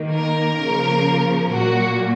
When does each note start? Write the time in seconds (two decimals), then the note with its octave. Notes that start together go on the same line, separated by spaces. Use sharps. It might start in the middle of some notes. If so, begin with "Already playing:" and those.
Already playing: D#3 A#3
0.14 A#4
0.60 C#3 F3 A#3
1.50 A#2 F#3 A#3 F#4